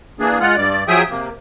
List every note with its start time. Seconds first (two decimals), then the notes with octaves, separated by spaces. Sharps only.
0.20 E3 A#3 D4 G#4
0.40 G#3 F4 F#5 F6
0.56 G2 D5
0.88 F3 F#3 G#4 E5 G5 D#6
1.10 C3 A#3